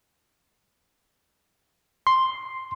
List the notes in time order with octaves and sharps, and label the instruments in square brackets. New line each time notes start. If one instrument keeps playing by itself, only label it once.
[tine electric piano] C6